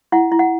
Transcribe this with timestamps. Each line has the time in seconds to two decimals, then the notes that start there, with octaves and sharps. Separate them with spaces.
0.12 E4 F#5
0.32 E4
0.39 F#5